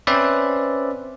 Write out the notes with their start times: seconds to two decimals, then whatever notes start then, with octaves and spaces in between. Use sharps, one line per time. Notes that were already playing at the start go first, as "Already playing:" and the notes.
0.07 C4 C#4 B4 C5 D5 E5